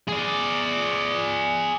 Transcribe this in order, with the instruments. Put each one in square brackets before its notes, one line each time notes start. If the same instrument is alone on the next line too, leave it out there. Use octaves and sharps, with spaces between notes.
[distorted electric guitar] G#4 D5